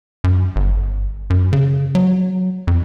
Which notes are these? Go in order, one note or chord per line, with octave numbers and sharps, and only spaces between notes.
F#2
G1
F#2
C#3
F#3
F2